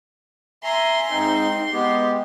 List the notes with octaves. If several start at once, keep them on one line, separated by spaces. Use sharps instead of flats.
E5 G#5 A#5 C6
G#2 C4 D#4
G#3 B3 G4